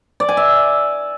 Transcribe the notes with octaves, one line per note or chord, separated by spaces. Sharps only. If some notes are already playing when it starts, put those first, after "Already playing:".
D5
G#5
E5